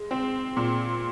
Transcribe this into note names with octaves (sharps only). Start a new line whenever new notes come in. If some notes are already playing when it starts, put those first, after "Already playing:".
Already playing: G#3
C4
A#2